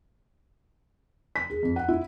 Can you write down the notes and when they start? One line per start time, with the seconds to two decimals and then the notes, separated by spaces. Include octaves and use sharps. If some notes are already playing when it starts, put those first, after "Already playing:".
1.36 B6
1.50 G#4
1.63 F2
1.76 F#5
1.88 E4